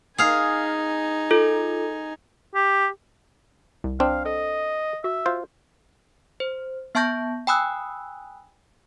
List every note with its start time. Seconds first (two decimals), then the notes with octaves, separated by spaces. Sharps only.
0.18 D#4 G#4 F5 G#5
1.31 F4 A4
2.55 G4
3.84 C2
4.00 C4 D4 F5
4.25 A4 D#5
5.04 F#4 E5
5.26 F4 C5
6.40 C5
6.95 B3 E5 A5 C#6 G6 A#6
7.47 G5 G#5 B5 D#6 E6 F#6